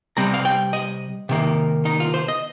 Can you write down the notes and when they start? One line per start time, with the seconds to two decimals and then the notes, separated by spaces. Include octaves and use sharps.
0.17 C3 G3 C4 A#5
0.34 F5
0.45 G5
0.73 D#5
1.29 C3 D#3 A#3
1.85 D#4
2.00 F4
2.14 C5
2.28 D#5